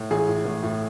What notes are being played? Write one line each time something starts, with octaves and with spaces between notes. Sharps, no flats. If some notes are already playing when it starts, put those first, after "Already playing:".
Already playing: A2
A1 G#4
A2
A1
A2